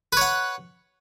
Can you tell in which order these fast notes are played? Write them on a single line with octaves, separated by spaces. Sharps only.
B4 C#5 F#5